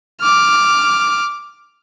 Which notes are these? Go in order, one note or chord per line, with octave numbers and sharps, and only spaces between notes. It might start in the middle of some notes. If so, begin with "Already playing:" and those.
D6 F6